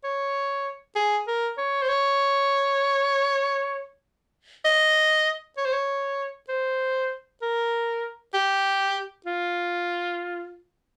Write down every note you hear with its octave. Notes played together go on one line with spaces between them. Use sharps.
C#5
G#4
A#4
C#5
C5
C#5
D#5
C#5
C5
C#5
C5
A#4
G4
F4